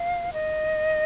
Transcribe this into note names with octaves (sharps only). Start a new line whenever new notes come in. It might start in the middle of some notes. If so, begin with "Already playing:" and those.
Already playing: F5
D#5